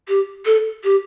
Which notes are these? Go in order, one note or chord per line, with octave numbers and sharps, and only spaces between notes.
G4
A4
G4